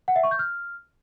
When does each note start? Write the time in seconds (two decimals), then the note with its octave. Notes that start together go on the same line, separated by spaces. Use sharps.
0.08 F#5
0.16 E5
0.23 C#6
0.31 G6
0.39 F6